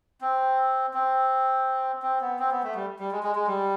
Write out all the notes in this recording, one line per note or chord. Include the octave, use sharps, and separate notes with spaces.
C4
C4
C4
B3
C4
B3
A3
G3
G3
G#3
G#3
G#3
G3